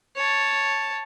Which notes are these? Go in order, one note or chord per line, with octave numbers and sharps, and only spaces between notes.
C#5 A5